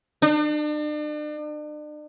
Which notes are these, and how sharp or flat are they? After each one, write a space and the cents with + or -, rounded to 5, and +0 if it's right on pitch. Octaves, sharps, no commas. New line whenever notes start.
D4 +40